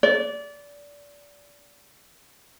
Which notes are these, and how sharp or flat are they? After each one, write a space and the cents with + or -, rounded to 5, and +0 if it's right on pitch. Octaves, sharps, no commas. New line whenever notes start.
D5 -25